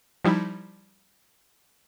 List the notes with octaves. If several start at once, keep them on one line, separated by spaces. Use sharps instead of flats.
F3 G3 D#4 E4